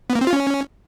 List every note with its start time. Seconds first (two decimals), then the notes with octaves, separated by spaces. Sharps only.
0.10 B3
0.15 A#3
0.21 C4
0.27 F4
0.33 C#4